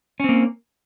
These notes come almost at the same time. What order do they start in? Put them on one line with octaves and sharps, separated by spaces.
C#4 C4 A#3